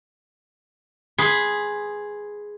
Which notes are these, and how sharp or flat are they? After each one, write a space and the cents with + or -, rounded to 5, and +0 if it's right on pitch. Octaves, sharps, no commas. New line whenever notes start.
G#4 +0 B4 +0 C6 +10